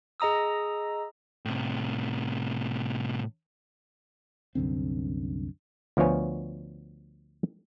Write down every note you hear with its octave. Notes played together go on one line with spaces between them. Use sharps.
G#4 D#5 A#5 D#6 E6
A2 C3
C2 F#2 D3 C4
D2 F3 B3 C#5 G#5